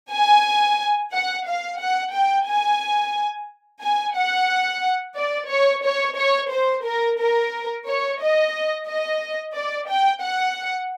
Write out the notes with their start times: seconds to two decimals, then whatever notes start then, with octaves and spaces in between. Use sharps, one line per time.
0.12 G#5
1.13 F#5
1.47 F5
1.79 F#5
2.14 G5
2.48 G#5
3.81 G#5
4.15 F#5
5.16 D5
5.50 C#5
5.84 C#5
6.17 C#5
6.52 C5
6.84 A#4
7.19 A#4
7.87 C#5
8.20 D#5
8.87 D#5
9.54 D5
9.88 G5
10.22 F#5